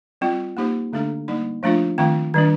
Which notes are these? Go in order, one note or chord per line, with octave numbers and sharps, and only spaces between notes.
G3 C4 F4
A#3 D#4 G4 C5
D3 A3 D4 A4
G3 A#3 D#4
F3 A3 D4 F4
D#3 A3 C4 F4
D#3 G3 D4